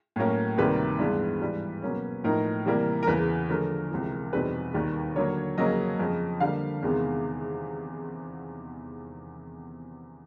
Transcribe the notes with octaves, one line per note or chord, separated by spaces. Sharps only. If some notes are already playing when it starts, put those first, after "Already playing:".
A2 F#3 A#3 C#4
D2 C3 D#3 G3 A#3 B4
G2 E3 G#3 B3 D4
G#2 E3 G3
B2 F#3 A#3 C#4
A2 F3 A#3 D#4 A#4
C3 E3 G3 A#3
A#4
E2 C#3 E3 B4
D3 F3 A3 A#4
C#2 C3 E3
E2 B2 G3 C4 D#4 B4
D#2 D#3 G3
D3 F#3 A#3 C#5
F2 C#3 F#3 A#3 C#4 D#5
F2 C#3 F3
D3 G3 A#3 F5
E2 C3 D#3 G#3 B3